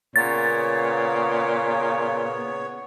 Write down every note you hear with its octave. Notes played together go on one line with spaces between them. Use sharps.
A#2 C#3 B3 C#5 A6